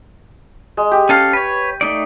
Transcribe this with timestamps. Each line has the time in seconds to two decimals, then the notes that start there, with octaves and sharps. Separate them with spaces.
0.77 G#3
0.91 G4
1.09 C#4 A4 F5
1.33 B4 C#5
1.81 A3 D#4 D5